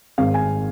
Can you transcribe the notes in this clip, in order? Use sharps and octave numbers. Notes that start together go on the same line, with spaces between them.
G#1 G#2 D#3 F5
G#5